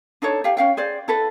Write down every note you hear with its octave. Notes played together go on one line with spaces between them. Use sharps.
D4 D#4 A4 C#5
G4 F5 G5
C#4 F5 G5
G#4 C5 D5
E4 A4 B4